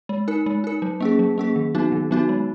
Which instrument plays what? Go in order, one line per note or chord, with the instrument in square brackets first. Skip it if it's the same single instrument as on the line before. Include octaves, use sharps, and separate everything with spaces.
[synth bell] G#3
D#4 A#4
G#3
D#4 A#4
F#3
A#3 C#4 G#4
F#3
A#3 C#4 G#4
D#3
F#3 B3 D#4 F#4
D#3
F#3 B3 D#4 F#4
G#3